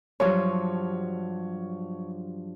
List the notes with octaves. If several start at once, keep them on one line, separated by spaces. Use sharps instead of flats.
G2 F3 F#3 C#5